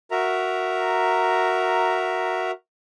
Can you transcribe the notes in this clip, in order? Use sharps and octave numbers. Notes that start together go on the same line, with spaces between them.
F#4 A#4 E5 A#5